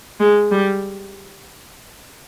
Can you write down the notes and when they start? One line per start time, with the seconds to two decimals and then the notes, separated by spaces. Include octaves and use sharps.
0.20 G#3
0.51 G3